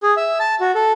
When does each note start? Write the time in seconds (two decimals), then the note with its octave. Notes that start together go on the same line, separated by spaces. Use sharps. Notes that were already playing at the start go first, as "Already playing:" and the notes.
0.03 G#4
0.17 E5
0.40 A5
0.61 F#4
0.75 A4